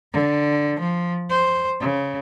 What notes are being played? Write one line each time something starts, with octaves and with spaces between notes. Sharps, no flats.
D3
F3
C5
C#3